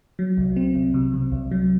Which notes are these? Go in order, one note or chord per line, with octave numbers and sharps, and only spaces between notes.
F#3
C2
C4
C2
C3
C3
C2
F#3